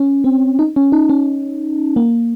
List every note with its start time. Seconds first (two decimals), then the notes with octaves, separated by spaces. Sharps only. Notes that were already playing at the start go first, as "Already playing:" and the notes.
Already playing: C#4
0.24 C4
0.59 D#4
0.76 C#4
0.92 D#4
1.09 C#4
1.96 A#3